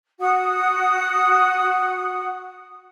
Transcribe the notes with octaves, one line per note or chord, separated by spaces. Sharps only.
F#4 F#5 D#6